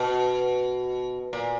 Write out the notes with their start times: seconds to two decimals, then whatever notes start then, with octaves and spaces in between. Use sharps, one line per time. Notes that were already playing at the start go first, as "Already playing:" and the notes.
Already playing: B2
1.33 A#2